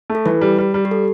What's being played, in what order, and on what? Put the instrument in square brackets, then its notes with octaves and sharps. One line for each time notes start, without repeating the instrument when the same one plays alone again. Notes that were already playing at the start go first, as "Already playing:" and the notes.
[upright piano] A3
[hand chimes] A4
[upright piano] E3 [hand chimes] B4
[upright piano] G3
G3
G3
[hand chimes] G4
A4